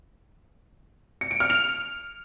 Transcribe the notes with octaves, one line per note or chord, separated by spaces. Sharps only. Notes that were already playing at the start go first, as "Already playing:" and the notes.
C#7
D7
F6
F7